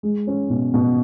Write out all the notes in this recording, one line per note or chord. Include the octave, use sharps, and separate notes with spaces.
G#3
C#4
B2
B2